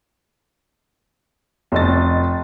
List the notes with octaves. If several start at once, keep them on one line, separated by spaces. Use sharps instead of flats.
F1 D#5 A6